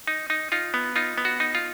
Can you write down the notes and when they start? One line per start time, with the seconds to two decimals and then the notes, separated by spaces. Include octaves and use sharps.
0.08 D#4
0.30 D#4
0.52 D#4 F4
0.74 B3
0.96 D#4 F4
1.18 B3
1.25 F#4
1.40 D#4
1.55 F4